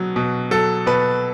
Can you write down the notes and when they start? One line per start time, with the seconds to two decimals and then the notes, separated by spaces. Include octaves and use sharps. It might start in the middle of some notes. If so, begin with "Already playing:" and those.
Already playing: B2 F#3
0.16 B2
0.51 F#3 A4
0.86 B2 B4